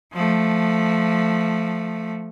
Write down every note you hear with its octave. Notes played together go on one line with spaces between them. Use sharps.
F3 A3